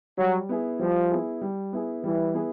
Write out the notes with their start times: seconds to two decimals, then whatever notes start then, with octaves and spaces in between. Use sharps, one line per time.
0.18 F#3 G3
0.49 B3 E4 G#4
0.79 F3 G3
1.11 B3 E4 G#4
1.41 G3
1.73 B3 E4 G#4
2.03 E3 G3
2.34 B3 E4 G#4